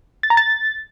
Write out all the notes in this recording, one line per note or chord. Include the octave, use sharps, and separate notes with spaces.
A6
A#5
A6